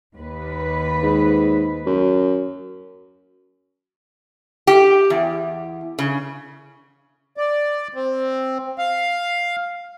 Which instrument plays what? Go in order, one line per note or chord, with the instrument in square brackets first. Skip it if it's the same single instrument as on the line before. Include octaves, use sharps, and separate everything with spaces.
[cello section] D#2 B4
[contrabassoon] G#2
F#2
[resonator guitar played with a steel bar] G4
E2
C#3
[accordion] D5
C4
F5